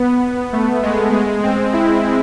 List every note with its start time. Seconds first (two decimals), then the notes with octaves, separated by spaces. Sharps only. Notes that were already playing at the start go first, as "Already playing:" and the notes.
Already playing: B3
0.53 A3
0.83 G#3
1.13 G#3
1.43 C4
1.73 E4